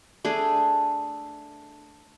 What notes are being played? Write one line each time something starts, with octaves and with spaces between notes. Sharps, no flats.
A3 D4 G#4